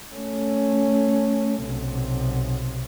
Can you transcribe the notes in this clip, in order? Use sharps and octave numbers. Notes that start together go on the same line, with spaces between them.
A3 C#4
B1 C3